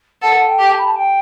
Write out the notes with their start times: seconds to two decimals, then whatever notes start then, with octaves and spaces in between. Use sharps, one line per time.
0.22 A4 F#5
0.47 G5
0.58 G4
0.70 A5
0.78 B5
0.85 A5
0.96 G5